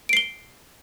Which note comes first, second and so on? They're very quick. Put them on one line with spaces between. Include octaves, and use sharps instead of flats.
D7 C7 G7